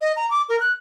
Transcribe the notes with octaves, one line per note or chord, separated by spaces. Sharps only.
D#5
A#5
D6
A#4
F#6